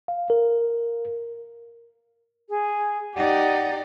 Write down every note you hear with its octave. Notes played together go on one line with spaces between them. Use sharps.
F5
A#4
G#4
D#4 G4 D5 F#5